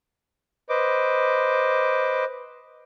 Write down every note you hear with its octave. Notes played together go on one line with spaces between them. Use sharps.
B4 C5 D#5 D6